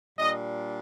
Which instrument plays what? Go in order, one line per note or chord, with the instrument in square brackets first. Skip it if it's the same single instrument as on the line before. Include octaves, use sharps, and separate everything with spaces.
[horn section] A#2 G3 D4 D#5